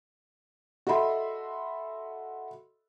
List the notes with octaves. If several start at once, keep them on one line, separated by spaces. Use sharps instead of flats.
F#4 A4 D#5 E5 B5 C6